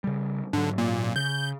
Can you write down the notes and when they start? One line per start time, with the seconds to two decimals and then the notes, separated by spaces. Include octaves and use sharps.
0.04 C#3 G3
0.53 G#2 D3 F#3
0.78 A#2
1.16 C#3 G6